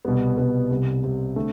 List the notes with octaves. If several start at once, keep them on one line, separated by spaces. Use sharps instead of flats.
C2 B2 G3 B3
C2 B2 G3 B3
C2 C3 G3
C2 C3 G3
D3 A3 C4